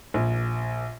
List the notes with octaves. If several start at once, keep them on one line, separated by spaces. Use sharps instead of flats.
A#1